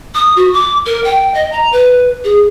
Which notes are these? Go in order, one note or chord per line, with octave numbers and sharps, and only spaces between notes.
D#6
F#4
D6
A#4
G5
D#5
A#5
B4
G#4